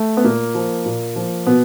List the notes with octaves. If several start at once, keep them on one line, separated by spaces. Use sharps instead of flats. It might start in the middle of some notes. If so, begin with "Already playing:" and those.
Already playing: A3
B3
A#2 A#3
F3
A#2
F3
B2 B3